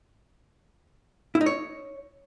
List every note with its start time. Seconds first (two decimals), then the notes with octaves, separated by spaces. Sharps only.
1.35 E4
1.41 D#4
1.46 C#5